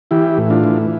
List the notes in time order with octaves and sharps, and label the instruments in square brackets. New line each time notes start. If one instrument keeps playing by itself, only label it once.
[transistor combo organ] E3 E4 G4
A2
D4 F4
E3